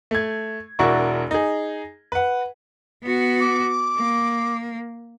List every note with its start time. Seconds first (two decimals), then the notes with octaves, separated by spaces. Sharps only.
0.11 A3 G#6
0.79 E1 D4 E4 F#4 A#4 C#6
1.31 D#4 G#4
2.12 B4 F#5
3.03 B3 F#4
3.40 D6
3.98 A#3